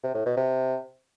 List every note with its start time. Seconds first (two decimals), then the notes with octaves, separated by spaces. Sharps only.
0.04 C3
0.15 A2
0.26 B2
0.37 C3